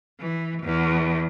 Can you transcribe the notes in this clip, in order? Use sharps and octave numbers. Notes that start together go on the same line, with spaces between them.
E3
E2